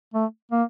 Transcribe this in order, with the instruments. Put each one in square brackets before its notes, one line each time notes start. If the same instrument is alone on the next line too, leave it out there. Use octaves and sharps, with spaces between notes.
[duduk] A3
A#3